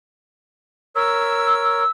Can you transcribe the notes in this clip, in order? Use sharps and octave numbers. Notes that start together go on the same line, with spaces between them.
A#4 C#5 E6